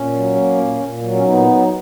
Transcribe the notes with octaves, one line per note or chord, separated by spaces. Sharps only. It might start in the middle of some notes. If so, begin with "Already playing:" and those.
Already playing: A#2 C#4
F#3
A#3
A#2
A#2
F#3
C#4
A#2 B3 D#4
F#3